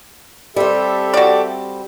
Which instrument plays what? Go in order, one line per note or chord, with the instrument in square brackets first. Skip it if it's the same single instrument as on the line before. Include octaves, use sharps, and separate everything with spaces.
[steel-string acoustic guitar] G3 C4 [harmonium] G4 A4 E5
[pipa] F#4 D5